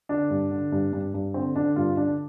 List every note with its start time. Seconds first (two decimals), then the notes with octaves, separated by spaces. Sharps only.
0.09 D3 D4
0.30 G2
0.51 D3
0.72 G2
0.93 G2
1.14 G2
1.34 D3 C4
1.56 D3 D4
1.76 G2 F4
1.97 D3 D4